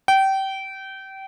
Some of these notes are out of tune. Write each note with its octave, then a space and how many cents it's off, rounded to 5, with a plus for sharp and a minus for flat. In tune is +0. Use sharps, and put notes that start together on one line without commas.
G5 -25